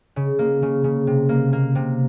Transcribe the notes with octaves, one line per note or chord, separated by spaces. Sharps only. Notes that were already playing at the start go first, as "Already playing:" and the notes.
C#3
A#3
C#3
C#3
C3
A#3
A#3
C3